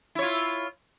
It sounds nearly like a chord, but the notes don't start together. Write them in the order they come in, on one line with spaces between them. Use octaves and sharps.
E4 C#5 F4